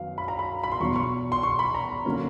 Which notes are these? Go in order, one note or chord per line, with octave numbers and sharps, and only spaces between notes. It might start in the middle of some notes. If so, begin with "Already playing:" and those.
Already playing: F#2 D#3 F#3 B3 F5
B5
A#5
B5
B5
C6
E2 B2 F#3 C#6
C#6
C6
C#6
B5
A#5
D3 F#3 A#3 C#4